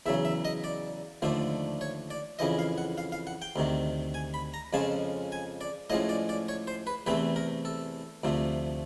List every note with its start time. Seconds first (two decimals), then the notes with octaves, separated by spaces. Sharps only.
0.06 E2 C#3 F#3 E5
0.25 E5
0.45 D#5
0.64 D5
1.22 D#2 D3 F3 A3 D4
1.81 C#5
2.10 D5
2.39 F2 C#3 E3 D#5
2.59 F5
2.78 F#5
2.98 F5
3.12 F5
3.27 F#5
3.42 G5
3.56 D2 C3 D#3
4.14 G#5
4.34 B5
4.54 A#5
4.73 F2 C#3 F3 G#3 C#4 A5
5.32 G#5
5.61 D5
5.90 A2 F3 G#3 C#4 D#5
6.09 D5
6.29 D5
6.49 C#5
6.67 C5
6.87 B4
7.07 E2 C3 E3 A3 C4 B4
7.36 A#4
7.65 A4
8.24 D2 C3 F3 A3